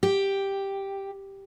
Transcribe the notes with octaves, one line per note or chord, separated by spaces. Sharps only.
G4